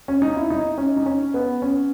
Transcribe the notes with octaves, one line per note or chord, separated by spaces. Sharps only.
C#4
D#4
E4
D#4
C#4
D#4
C#4
B3
C#4